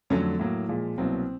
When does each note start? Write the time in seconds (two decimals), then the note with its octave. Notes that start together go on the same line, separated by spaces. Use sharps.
0.10 F2 D3 F#3 A3 C#4
0.39 A2 F#3 A#3
0.69 A#2 F3 G#3
0.98 C2 B2 F#3 A#3 C4